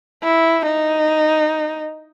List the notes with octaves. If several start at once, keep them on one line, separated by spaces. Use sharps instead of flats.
E4
D#4